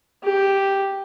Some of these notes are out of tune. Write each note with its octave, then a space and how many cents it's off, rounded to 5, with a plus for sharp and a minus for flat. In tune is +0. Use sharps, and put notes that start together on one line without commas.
G4 +0